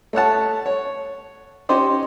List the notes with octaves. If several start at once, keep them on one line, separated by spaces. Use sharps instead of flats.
A3 C#5 F#5 A5
C#5
C#4 D#4 G4 C5 D5